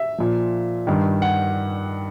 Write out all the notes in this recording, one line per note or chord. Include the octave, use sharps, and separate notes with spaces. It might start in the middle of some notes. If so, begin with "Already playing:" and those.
Already playing: E5
A#2 F3
G2 D#3
F#5